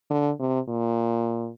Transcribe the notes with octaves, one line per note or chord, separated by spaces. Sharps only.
D3
C3
A#2